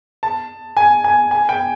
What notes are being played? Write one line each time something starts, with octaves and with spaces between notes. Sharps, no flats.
A5
G#5
G#5
G#5
G5